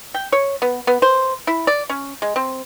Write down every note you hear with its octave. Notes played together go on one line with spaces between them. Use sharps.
G5
C#5
B3
B3
C5
E4
D5
C#4
G#3
C4